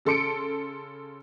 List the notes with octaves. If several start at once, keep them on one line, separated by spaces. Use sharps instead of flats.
C#3 A4 C6 C#7 D7